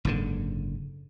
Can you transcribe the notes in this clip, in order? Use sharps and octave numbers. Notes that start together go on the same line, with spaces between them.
F#1 G#2 D3